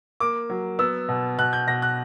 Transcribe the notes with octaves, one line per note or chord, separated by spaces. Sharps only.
A#3 D6
F#3
B3 E6
B2
B2 F#6
G6
B2 A#6
F#6